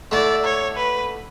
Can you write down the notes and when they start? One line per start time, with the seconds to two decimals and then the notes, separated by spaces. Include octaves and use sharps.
0.11 D3 A3 E4 A4 D5
0.44 C#5
0.76 B4